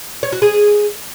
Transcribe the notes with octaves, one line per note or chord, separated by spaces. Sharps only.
C#5
F#4
G#4